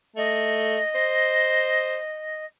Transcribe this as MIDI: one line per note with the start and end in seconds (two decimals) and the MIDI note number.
0.17 0.79 57
0.17 2.45 75
0.95 1.98 72